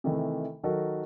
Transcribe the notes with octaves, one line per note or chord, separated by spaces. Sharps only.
C3 D#3 E3 A3
D#3 F#3 D#4 F#4 A4 A#4